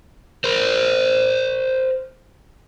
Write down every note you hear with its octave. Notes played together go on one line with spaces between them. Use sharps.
A#4 C5